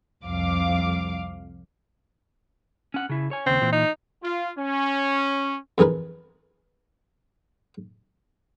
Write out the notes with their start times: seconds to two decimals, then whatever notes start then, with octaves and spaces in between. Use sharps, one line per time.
0.24 C2 F2 F5 D6
2.94 C#4 F#5
3.09 C#3 E4
3.31 C#5 G#5
3.46 D#2 C#3 C4
3.61 A#2 E3
3.73 D#4
4.23 F4
4.58 C#4
5.78 F2 E3 G#4 A#4 B4